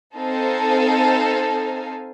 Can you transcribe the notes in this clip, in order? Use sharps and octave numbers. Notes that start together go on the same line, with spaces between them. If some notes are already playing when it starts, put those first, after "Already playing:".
C4 D#4 A4 F5 G#5